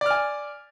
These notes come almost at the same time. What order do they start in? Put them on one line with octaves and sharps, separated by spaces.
D5 F6 G#5